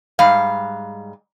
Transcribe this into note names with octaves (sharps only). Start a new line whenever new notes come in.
G#2 G3 F5